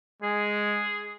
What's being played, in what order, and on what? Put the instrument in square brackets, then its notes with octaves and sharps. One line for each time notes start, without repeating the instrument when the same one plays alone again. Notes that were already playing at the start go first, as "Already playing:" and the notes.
[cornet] G#3 [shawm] G#4